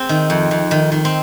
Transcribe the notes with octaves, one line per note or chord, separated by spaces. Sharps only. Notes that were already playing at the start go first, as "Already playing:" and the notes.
Already playing: C4 G#4
D#3
F2
F2
D#3
D#3
C4